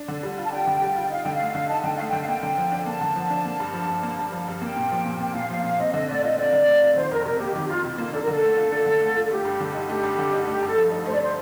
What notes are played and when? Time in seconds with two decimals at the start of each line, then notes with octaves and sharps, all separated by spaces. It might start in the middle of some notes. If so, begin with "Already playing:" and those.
Already playing: D4
0.08 D3
0.23 G3
0.38 F4
0.45 A5
0.53 D4 G5
0.67 D3
0.82 G3
0.96 F4
1.10 D#4 F5
1.24 D3 G5
1.36 A3 F5
1.55 D3
1.69 D#4 A5
1.82 D3 G5
1.95 A3 F5
2.08 D3 G5
2.20 F5
2.28 A#3 G5
2.43 D3
2.58 F3
2.72 D4
2.86 A#3 A5
3.01 D3
3.16 F3
3.30 D4
3.45 A#3
3.60 G2
3.74 F3
3.89 G2
4.03 A#3
4.19 G2
4.32 F3
4.48 G2
4.62 A#3 G5
4.77 A#2
4.92 F3
5.05 A#2
5.20 A#3 G5
5.35 A#2 F5
5.50 F3 F5
5.64 A#2 F5
5.79 C4 D#5
5.94 D3 D#5
6.08 A3 D5
6.23 F4 D#5
6.38 C4 D5
6.53 D3
6.67 A3
6.82 F4
6.96 D#3 C5
7.11 F2 A#4
7.25 C3 A#4
7.40 A#3 G4
7.55 D#3 G4
7.67 F2 F4
7.84 C3
7.91 F4
7.98 A#3
8.13 D4 A4
8.22 A#4
8.28 D3
8.33 A4
8.43 A3
8.57 F4
8.72 D4
8.86 D3
9.02 A3
9.16 F4
9.24 A4
9.31 A3 G4
9.45 G2
9.60 D3
9.75 D#4
9.89 A3 G4
10.03 G2
10.19 D3
10.33 D#4
10.47 A3 G4
10.63 G2 A4
10.76 F3
10.92 D#4
11.06 A3 C5
11.14 D5
11.22 C5